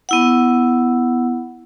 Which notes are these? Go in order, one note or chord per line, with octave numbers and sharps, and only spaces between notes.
B3 E4 F#5